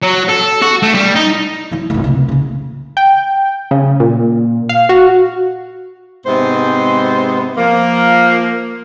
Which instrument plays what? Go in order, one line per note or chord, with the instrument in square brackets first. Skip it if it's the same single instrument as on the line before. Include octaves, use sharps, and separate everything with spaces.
[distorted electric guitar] F#3
A4
F#4
A3
G3
D#4
[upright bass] F#3 E4
F1 F#2
C#2 C3
D#1 C#3
[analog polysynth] G5
C#3
A#2
F5
F#4
[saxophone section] G#2 C3 G#3 B3 C5
F3 A#3